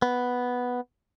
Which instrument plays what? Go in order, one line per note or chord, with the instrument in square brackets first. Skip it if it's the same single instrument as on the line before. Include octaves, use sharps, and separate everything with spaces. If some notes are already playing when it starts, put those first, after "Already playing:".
[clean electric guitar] B3